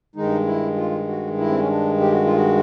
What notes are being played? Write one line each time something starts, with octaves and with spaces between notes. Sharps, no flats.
G2 D#3 G#3 D#4
E4
F4
F#4
E4
C4
C#4
D4
G4
F#4
F4
F#4